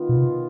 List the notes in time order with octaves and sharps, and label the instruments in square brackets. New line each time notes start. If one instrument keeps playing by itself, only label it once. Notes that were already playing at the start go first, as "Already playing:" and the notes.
Already playing: [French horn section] D#3 B3 F4
[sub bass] B2
C3